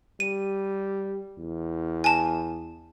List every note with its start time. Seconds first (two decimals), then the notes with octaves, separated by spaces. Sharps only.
0.20 G3 D#7
1.38 E2
2.04 G#5 A5